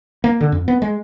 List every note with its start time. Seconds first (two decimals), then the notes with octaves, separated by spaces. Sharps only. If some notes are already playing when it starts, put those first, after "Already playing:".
0.24 A#3
0.41 D3
0.52 F2
0.68 B3
0.82 G#3